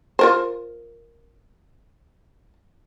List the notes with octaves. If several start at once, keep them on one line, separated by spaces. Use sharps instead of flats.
F4 A#4 C5